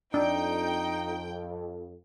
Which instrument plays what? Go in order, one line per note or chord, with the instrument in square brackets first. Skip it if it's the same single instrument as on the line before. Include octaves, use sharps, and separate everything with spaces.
[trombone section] F2 [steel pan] D4 [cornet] D#4 [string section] G5